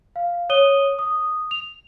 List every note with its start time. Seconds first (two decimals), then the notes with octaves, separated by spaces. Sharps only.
0.16 F5
0.50 C#5 D#6 D#7 G7
0.99 D#6
1.51 F7